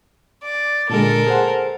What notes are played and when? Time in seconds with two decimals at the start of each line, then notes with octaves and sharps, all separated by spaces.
0.43 D5
0.90 A#2 D3 G#3 A4 A#4
1.27 G#4 C5 F#5